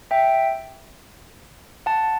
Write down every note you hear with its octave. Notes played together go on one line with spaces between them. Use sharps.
E5 G5
F#5 A5